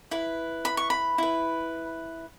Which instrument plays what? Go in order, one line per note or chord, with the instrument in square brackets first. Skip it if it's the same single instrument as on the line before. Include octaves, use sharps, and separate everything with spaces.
[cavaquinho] E4 B4
B5
C#6
B5
E4 B4